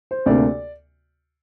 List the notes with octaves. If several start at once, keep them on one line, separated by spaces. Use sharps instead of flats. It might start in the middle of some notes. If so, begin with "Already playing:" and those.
C5
D2 C3 A#3 D4 D5